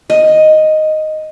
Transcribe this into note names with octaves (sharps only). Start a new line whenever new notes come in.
D#5